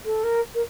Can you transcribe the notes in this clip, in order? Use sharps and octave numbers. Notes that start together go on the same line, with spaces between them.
A4
A#4
A#4